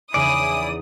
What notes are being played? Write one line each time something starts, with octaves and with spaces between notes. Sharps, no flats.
E2 C#3 D#4 E4 D5 G#5 D#6